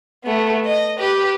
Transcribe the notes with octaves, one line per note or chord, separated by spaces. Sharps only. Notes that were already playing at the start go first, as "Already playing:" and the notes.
A3 B3
D#5
G4 B4